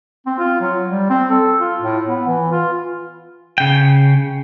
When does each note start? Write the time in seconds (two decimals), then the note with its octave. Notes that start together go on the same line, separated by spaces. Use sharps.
0.26 C4
0.38 F4
0.61 F#3
0.89 G3
1.10 C4
1.30 A4
1.60 F4
1.81 A2
2.09 B3
2.27 E3
2.52 F4
3.58 C#3 G5